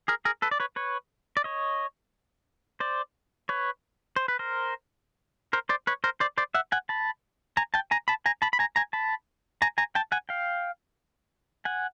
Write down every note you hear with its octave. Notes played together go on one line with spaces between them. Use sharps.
G#4 A#4
G#4 A#4
A4 B4
D5
B4 C#5
B4 C#5
D5
C#5 D#5
C5 D5
B4 C#5
C5
B4
A#4 C5
A#4 C5
C5 D5
B4 C#5
A#4 C5
C5 D5
C5 D5
E5 F#5
F#5 G#5
A5 B5
G#5 A#5
G5 A5
G#5 A#5
A5 B5
G#5 A#5
A5 B5
B5
G#5 A#5
G#5 A#5
A5 B5
G#5 A#5
G#5 A#5
G5 A5
F#5 G#5
F5 G5
F#5 G#5